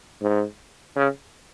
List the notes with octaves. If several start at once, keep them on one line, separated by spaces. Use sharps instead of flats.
G#2
C#3